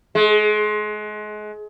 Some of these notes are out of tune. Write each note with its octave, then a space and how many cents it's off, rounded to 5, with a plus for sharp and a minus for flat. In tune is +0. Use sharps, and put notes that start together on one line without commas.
G#3 +30